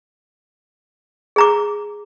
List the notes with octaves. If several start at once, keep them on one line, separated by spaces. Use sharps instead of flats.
G#4 A#5 D6